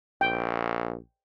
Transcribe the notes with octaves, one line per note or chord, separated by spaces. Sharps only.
A#1 G5